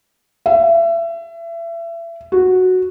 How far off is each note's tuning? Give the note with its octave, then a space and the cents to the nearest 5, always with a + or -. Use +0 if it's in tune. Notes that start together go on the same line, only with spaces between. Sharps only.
E5 +30
F#4 -5